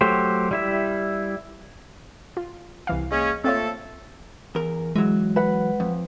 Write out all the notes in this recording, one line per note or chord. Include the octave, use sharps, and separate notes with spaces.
F#3 A3 G4 C5
G3 E4 E5
F4
C2 E3 F5
G#3 A#3 C#4
A3 A#3 C4 F4 A4 C#5
E2 A#4
E3 F#3 G#3
B4 F#5
F2